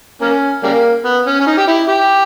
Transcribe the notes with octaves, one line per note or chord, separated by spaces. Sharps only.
A#3 C#4
C#3 G3 A#3
B3
C#4
C#4
D#4
G4
E4
G4